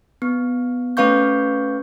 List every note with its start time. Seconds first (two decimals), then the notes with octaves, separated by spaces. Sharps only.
0.22 B3
0.97 A3 C#4 B4 F5 C#6 G6